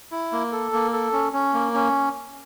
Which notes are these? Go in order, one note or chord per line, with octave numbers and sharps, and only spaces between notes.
E4
A#3
A4
A#3
A4
C#4
C#4
A#3
C#4